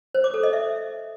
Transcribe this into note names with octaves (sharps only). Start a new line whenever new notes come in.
C5
D6
A4
D#5
E5